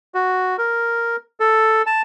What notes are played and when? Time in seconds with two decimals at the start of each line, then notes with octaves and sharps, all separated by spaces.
0.14 F#4
0.58 A#4
1.40 A4
1.86 A5